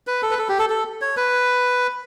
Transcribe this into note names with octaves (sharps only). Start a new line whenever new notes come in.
B4
A4
B4
A4
G4
A4
A4
C#5
B4